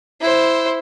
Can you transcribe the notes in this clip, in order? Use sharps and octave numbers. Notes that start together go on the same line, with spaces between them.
E4 C5